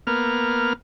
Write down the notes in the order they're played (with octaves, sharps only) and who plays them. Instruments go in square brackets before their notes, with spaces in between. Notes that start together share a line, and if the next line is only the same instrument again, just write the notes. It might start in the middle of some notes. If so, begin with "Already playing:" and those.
[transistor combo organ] A#3 B3 F6